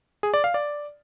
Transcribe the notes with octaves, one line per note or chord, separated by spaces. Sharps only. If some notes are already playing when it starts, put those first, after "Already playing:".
G#4
D5
F5
D5